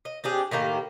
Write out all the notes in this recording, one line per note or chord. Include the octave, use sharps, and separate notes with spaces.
D#5
C4 D4 G4 G#4
A2 D#3 A#3 G4